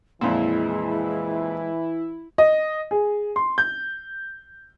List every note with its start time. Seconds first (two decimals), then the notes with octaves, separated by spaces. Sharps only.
0.21 F2 A#2 E3 G#3 E4
2.38 D#5
2.91 G#4
3.36 C6
3.58 G6